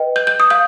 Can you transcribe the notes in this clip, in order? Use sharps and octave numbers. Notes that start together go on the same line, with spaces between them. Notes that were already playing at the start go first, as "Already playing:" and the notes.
Already playing: B4 D#5 G5
G6
G6
D#6
F5 G6